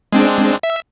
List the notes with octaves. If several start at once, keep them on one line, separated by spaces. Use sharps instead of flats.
G#3 C4 D4
E5